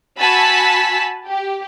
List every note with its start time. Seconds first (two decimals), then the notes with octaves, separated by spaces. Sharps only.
0.17 F#4 G#5 A5 B5 E6 B6
1.26 G4